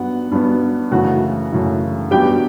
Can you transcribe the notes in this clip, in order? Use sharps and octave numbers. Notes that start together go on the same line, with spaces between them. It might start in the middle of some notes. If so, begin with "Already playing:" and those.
Already playing: G2 F#3 B3 F#5
G2 F#3 B3
F#2 C#3 E3 A3 F#4 F#5
F#2 C#3 E3 A3
G2 F#3 B3 G4 G5